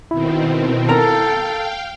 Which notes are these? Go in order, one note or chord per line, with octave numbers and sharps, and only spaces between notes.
B2 D#3 C4 E4
A4 A#4 F5 G5 A#5